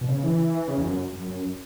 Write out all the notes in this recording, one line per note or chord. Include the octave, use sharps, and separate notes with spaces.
B2
C#3
E3
C#3
E2
F#2
F#2
F#2